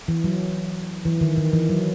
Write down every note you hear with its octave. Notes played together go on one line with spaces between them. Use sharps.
E3
F#3
E3
D#3
D#3
E3
F#3